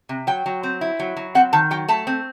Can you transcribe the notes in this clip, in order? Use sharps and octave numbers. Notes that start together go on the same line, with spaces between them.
C3
F#3 G5
F#3
C4
E4
F#3
F#3
C4 F#5
D#3 A5
F#3 G5
A3 A5
C4